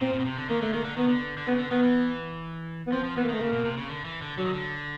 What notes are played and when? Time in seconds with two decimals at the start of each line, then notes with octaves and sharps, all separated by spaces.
0.01 A#2 C4
0.13 A#2
0.19 B2
0.25 C3
0.38 D3
0.49 D#3 A#3
0.61 D3 A3
0.73 D#3 A#3
0.85 D3
0.97 D#3 B3
1.08 D3
1.38 D3
1.47 C#3 B3
1.59 D3
1.71 D#3 B3
1.83 E3
2.87 B3
2.92 F3 C4
3.04 F3
3.17 E3 B3
3.24 A#3
3.29 D#3 A3
3.40 C#3 A#3
3.53 B2
3.65 C3
3.77 C#3
3.89 D3
4.05 E3
4.22 D3
4.38 D3 F#3
4.45 D#3
4.53 D3